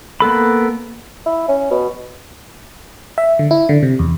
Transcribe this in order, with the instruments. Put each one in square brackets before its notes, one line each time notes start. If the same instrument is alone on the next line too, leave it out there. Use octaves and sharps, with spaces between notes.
[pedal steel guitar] A#3 B3 A4 B5
[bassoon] E4
C#4
B2
[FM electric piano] E5
D3
E4
D3
C3
E2